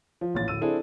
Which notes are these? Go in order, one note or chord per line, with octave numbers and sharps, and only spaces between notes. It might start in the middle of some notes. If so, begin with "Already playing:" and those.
F3
A1 A#2 A6
D1 E6 D#7
C4 D4 E4 G#4 A4